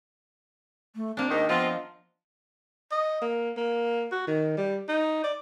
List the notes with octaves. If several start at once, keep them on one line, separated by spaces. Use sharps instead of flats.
A3
A#3 C4 D4
D#2 G#2 D#3 D#5
F3 B3 C4 F4 D#5
D#5
A#3
A#3
F#4
D#3
G3
D#4
D5